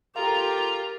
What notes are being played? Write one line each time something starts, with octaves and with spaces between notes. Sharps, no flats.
F4 G4 A4 A#4 F5 A#5